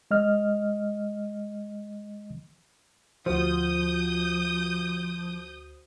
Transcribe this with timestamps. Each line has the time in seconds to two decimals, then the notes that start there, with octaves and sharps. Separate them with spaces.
0.11 G#3 D#5 F6
3.26 D2 F3 F#4 C5 D#6 G6